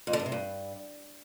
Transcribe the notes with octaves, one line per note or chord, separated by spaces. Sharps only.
F2
D3
G2
C3
G2